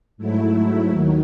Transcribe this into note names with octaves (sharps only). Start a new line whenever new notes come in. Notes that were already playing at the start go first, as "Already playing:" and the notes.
G#2 F#3 A3 E4
D#2 D#3 F#3